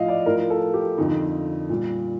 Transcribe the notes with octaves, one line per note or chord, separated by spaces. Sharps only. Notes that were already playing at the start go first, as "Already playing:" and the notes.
Already playing: A2 F3 D#5 F5
D5
A2 F3 A#4
A4
G4
F2 D3 F3 D#4
A#2 G3